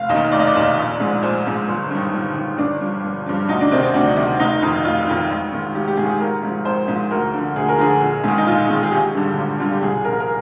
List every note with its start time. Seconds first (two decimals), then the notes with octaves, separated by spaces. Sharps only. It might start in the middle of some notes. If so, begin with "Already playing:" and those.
Already playing: F1 F5
0.09 D#2 D#3 D#5
0.32 F1 D5
0.39 D#5
0.47 D5
0.55 D#2 D#3
0.77 A#1
1.00 G#2 F3
1.22 A#1 C5
1.45 G#2 F3
1.68 G1
1.90 G2 D#3
2.13 G1
2.36 G2 D#3
2.58 G1 D4
2.81 G2 F3
3.04 G1
3.26 G2 F3
3.49 D2 D#4
3.61 D4
3.71 C3 D#3 C4
3.82 C4
3.94 D2 D4
4.17 C3 D#3
4.40 F1 D#4
4.62 F2 D#3 D#4
4.84 F1 F4
5.07 F2 D#3
5.30 G#1
5.52 G#2 D#3
5.75 G#1 G4
5.88 G4
5.97 G#2 D#3 G#4
6.20 G#1 A#4
6.43 G#2 F3
6.65 G#1 C5
6.88 G#2 F3
7.11 D2 A#4
7.34 D3 F3
7.56 D2 G#4
7.69 A#4
7.78 D3 F3 G#4
8.01 A#1
8.24 G#2 D#3
8.38 D#4
8.46 A#1 F4
8.69 G#2 D#3
8.83 G#4
8.91 G#1 G4
9.14 G2 D3
9.37 G#1
9.60 G2 D3 F4
9.72 G4
9.83 C2 G#4
10.05 A#2 F3 A#4
10.20 A#4